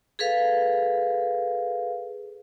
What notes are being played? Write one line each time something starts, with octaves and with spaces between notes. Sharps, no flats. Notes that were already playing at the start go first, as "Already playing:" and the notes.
G#4 A4 B4 F5